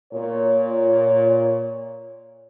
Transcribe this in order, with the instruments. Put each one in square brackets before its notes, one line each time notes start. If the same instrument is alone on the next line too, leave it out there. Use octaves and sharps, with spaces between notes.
[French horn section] A#2 C#5